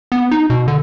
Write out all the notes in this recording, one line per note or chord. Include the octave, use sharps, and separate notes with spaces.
B3
D#4
B2
D3